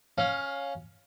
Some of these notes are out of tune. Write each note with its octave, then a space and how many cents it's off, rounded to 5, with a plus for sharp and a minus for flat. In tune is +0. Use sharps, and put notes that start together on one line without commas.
C#4 +0 F5 +15